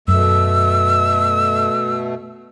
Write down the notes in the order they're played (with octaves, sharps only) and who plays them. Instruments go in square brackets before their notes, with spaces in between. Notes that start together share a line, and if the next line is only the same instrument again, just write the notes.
[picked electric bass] F#2 [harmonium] B2 A3 [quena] E6